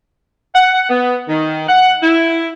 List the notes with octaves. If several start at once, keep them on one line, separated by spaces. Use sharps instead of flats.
F#5
B3
D#3
F#5
E4